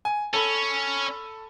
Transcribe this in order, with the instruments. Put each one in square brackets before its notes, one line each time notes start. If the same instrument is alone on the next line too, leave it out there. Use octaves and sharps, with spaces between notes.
[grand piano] G#5
[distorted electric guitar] C#4 [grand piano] A4 B5